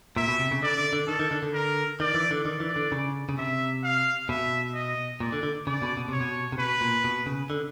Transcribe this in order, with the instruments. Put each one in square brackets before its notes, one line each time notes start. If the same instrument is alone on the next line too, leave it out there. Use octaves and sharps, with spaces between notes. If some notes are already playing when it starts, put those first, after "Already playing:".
[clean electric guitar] A#2 [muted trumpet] E5
[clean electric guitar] B2
C3
C#3
[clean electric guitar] D3 [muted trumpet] D5
[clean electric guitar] D3
D3
[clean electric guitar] D#3 [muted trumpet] A4
[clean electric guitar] D#3
D3
D3
[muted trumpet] A#4
[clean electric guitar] D#3 [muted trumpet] D5
[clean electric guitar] E3
D3
[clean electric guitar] D#3 [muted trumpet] D5
[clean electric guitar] E3
D3
C#3
C#3
[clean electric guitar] C3 [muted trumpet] E5
[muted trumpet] F5
[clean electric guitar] B2 [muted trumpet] E5
[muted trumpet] D#5
[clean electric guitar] A#2 [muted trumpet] D5
[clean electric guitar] D3
D3
[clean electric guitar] C#3 [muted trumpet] D5
[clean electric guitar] B2
B2
[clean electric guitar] C3 [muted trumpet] C#5
[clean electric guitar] B2
C3
[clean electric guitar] B2 [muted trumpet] B4
[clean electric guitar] A#2
B2
C#3
D3